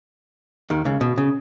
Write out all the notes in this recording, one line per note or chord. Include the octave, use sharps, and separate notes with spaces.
D#2 D#3
C#2 C#3
B2
C#3